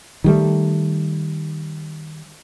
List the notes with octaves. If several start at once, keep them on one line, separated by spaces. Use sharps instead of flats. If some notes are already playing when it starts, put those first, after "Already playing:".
D#3 G3 A3